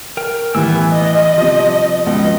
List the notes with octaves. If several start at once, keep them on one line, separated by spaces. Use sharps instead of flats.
A#4 G5
A2 E3 G3 B3 G#5 E6
D#5
C3 F3 G3
C#2 B2 D#5